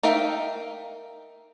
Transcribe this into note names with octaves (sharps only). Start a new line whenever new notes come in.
D#4 A#4 E5 F5 G5